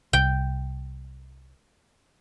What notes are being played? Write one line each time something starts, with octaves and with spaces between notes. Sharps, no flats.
C2 G5